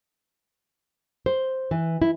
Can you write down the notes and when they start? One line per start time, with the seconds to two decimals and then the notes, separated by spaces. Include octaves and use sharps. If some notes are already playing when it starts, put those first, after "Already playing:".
1.26 C5
1.71 E3
2.02 E4